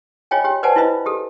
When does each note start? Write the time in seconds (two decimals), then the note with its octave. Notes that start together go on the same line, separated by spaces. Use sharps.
0.31 F4 C#5 D#5 G5 G#5
0.44 G4 C#5 G5
0.63 B4 C5 D5 F#5 G#5 A5
0.76 E4 F4 B4 C5 D#5
1.06 G4 A4